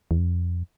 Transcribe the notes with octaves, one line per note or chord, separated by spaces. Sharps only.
E2
F2